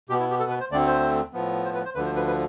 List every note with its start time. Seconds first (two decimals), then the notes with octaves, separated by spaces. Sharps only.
0.09 B2 B3 G4
0.20 E4
0.30 G4
0.40 A4
0.50 B4
0.60 C5
0.71 D2 D3 A3 C4 D5
0.87 C5
1.33 A2 F3 B3
1.65 C5
1.74 B4
1.85 C5
1.95 D2 D3 F3 B4
2.06 C5
2.16 B4
2.27 B4